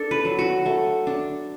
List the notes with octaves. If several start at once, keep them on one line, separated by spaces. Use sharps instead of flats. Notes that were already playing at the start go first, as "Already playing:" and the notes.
Already playing: D4 A4
B4
F#3
F#4
A3
D4